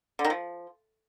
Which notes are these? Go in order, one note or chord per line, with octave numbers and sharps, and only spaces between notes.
D3
D#3
F3